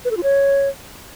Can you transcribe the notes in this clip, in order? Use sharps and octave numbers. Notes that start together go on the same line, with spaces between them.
B4
A4
F4
C#5